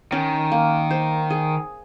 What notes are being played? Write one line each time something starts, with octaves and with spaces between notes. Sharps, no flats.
D#3 C#4
A#3
C5
G#4